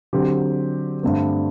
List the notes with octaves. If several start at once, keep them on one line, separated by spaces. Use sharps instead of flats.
D3 F#3 C4 G4
G2 D3 A3 C4